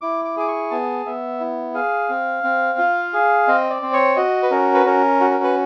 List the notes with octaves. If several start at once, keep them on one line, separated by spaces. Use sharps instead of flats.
E4 D6
D6
G#4 D6
C#6
B3 A5
B3 E5
E4
G#4 F5
C4
C4
F4
G#4
C4 D#5
D5
C4
C#5
F#4 D#5
B4
C#4 A#4
B4
C#4 A#4
F#4
A#4
B4